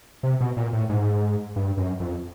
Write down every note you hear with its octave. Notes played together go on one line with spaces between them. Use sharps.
C3
B2
A#2
A2
G#2
G2
F#2
F2